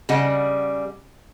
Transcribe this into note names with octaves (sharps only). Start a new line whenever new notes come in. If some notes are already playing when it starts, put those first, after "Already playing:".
C#3 G3 D#5 F#5